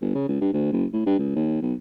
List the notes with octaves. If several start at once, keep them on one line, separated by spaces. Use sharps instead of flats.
G1
C#3
C#2
G2
D2
F#1
A2
G2
C#2
D#2
B1